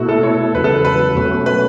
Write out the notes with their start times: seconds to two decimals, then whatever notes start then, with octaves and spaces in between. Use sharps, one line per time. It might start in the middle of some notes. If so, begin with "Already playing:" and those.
Already playing: B2 A3 E4 F#4
0.09 A4
0.23 C#5
0.54 E2 C#3 F#3 B4
0.64 A4
0.74 B4
0.85 B4
1.16 B2 F#3 A3 C#4
1.46 B4